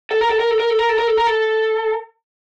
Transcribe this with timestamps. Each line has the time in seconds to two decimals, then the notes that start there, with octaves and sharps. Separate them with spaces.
0.11 A4
0.21 A#4
0.30 A4
0.40 A#4
0.51 A4
0.60 A#4
0.70 A4
0.79 A#4
0.89 A4
0.99 A#4
1.08 A4
1.17 A#4
1.27 A4